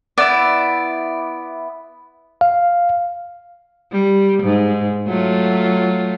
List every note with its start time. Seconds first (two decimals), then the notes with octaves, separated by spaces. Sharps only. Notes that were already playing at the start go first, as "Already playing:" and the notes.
0.18 B3 E4 D5
2.41 F5
3.92 G3
4.43 G#2
5.07 F#3 A3 F4